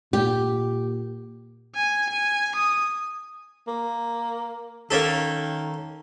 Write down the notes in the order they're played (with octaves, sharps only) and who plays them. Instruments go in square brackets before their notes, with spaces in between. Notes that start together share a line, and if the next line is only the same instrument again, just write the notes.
[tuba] A#2 [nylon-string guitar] G4
[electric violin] G#5
G#5
D#6
[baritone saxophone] A#3
[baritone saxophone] D#3 [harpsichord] A#3 C#4 A4